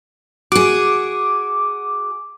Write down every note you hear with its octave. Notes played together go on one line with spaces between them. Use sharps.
F#4 G#4 D6